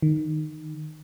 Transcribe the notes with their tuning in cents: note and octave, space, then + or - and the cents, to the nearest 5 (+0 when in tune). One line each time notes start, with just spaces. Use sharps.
D#3 -10